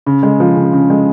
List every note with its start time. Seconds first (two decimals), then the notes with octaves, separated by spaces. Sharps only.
0.06 C#3
0.23 G#3
0.40 F3
0.56 C#3
0.73 C#3
0.90 G#3